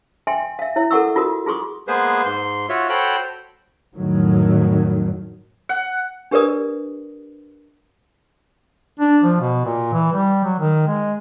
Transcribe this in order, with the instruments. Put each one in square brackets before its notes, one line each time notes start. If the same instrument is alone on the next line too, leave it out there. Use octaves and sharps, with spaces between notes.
[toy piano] E5 G5 G#5 C6
E5 F5
E4 C#5 E5
A4 A#4 F#5 C#6 E6
F4 F#4 A#4 D#6
F4 G#4 C6 C#6 D#6
[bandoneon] G#3 A#3 B3 G#4 B4 C5
G#2 C6
F4 F#4 C#5 E5
F#4 A4 C5 C#5 G5 B5
[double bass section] F2 A2 D#3 F#3
[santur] F#5
[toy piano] D4 G4 A#4 B4 D5 D#6
[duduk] D4
F3
B2
A#2
E3
G3
F#3
D#3
G#3